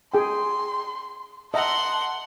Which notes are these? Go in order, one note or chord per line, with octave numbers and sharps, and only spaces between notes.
G#4 G5 C6
D#5 E5 F#5 A5 A#5 C6